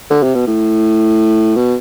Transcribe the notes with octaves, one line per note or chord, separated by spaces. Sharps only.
D3
C3
B2
A2
B2